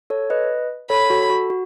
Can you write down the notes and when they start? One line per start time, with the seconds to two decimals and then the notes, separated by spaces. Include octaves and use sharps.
0.10 A4 C#5
0.30 B4 D#5
0.90 A4 C#5 B5
1.10 F#4 A4
1.30 F#4
1.50 F#4